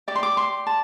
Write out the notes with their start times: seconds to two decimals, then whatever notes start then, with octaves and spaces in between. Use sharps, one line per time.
0.08 G4 D5 D6
0.16 C6
0.23 D6
0.37 C6
0.67 A5